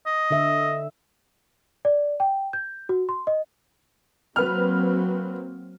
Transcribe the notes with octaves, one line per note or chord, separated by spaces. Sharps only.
D#5
D3 E5
D5
G5
G6
F#4
C6
D#5
F#3 A#3 C4 B4 F6